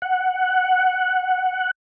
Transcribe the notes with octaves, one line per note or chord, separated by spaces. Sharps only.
F#5